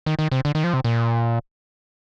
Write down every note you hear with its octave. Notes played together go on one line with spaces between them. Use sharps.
D#3
D#3
C3
D3
D#3
F3
C3
A#2